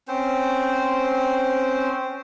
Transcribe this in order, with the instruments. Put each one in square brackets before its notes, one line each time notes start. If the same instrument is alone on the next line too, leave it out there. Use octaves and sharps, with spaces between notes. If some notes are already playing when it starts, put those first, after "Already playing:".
[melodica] C4 C#4 C5